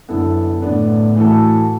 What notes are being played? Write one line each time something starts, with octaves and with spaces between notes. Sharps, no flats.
F#2 D3 B3 E4 A4
A2 D3 B3 D4
E3 A3 F#4 A4